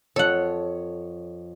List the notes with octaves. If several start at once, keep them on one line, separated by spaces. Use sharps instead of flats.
F2 A4 C#5 F#5